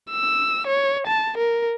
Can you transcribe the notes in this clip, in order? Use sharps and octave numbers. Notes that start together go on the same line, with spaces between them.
E6
C#5
A5
A#4